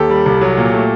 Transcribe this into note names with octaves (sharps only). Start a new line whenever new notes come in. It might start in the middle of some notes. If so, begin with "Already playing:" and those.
Already playing: D#2 G4 A4
G3
C2
F#3
A#2
A3